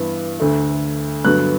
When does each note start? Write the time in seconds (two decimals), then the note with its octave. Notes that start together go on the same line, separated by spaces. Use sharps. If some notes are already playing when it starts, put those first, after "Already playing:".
Already playing: G2 E3 B3
0.40 D2 D3 A3
1.25 G2 D3 F#3 B3 F#6